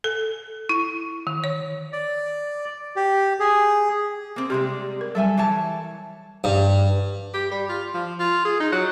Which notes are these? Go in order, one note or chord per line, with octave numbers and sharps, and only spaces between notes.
A4
E4
D#3
C#5
D5
G4
G#4
A#3 C4
C3 G3 G#3 G4 C6
A#4
F#3 G3 A4 E5 G#5
E3 C#5 A5
G2
G4
G3
F4
F3
F4
G#4
D#4
F#3